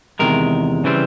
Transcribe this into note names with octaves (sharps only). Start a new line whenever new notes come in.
E2 C3 D#3 G#3 A#4
C#3 E3 G3 C4